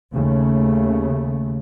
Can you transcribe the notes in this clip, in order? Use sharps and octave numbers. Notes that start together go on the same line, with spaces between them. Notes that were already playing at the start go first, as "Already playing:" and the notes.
D#2 C#3 A3